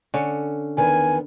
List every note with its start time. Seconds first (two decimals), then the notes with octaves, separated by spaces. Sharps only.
0.14 D3 C#4
0.77 E2 D#3 B3 G#5